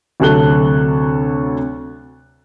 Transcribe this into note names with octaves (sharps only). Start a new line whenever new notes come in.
D2 C3 F#3 A4 F#6 G7